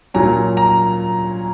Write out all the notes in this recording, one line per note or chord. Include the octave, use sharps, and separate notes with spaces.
A#2 F#3 C#4 A#5
A#5